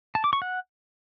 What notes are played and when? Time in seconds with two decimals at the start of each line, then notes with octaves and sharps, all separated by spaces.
0.15 A5
0.24 D6
0.33 C#6
0.42 F#5